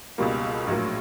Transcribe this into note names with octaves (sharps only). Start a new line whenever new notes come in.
C#2 B2 G3 A#3
A#1 A2 F#3 A#3